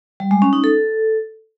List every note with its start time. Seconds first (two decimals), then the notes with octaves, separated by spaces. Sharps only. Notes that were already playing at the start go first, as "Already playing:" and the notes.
0.20 G3
0.31 G#3
0.42 C#4
0.53 D#4
0.64 A4